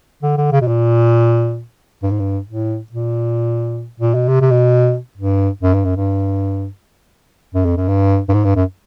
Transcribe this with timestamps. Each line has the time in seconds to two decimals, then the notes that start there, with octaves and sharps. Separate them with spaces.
0.23 D3
0.37 D3
0.52 C#3
0.61 B2
0.68 A#2
2.03 G2
2.11 G#2
2.20 G2
2.47 A2
2.92 A#2
4.00 A#2
4.14 B2
4.28 C3
4.41 C3
4.51 B2
5.18 G2
5.63 F#2
5.74 G2
5.85 F#2
5.96 G2
7.54 F#2
7.65 F2
7.77 F#2
7.88 G2
8.29 G2
8.34 G#2
8.44 G2
8.56 F#2